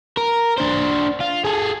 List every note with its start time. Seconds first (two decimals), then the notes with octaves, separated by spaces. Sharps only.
0.17 A#4
0.58 D4 C5
1.20 F4
1.45 G#4 A4